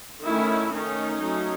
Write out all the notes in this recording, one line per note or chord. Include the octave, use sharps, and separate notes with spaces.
D#3 A3 C#4 E4
D#3 A3 C#4 D#4
F#3 A3 C#4